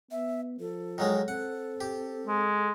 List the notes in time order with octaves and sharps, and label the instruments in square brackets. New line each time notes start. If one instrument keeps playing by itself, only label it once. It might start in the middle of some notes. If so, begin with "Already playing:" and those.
[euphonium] B3 [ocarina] E5
[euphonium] F3 [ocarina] A4
[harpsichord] D#3 F#3 G#3
[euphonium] C4 [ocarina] A4 [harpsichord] F#5
[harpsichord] G4
[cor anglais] G#3